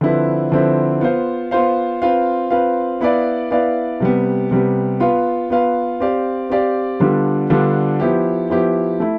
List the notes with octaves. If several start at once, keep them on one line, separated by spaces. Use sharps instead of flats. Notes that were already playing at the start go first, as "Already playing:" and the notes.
D3 F3 C4 E4 B4
D3 F3 C4 E4 B4
B3 F4 C5 F5
B3 F4 C5 F5
C4 F4 B4 F5
C4 F4 B4 F5
B3 E4 B4 D5 F5
B3 E4 B4 D5 F5
C3 G3 B3
C3 G3 B3
B3 F4 B4 F5
B3 F4 B4 F5
C4 G4 D5 F5
C4 G4 D5 F5
D3 G3 B3 D4 F4
D3 G3 B3 D4 F4
F3 B3 E4 G4
F3 B3 E4 G4
A3 E4